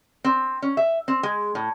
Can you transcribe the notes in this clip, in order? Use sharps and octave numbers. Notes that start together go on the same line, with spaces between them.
C4
C#4
E5
C4
G#3
A2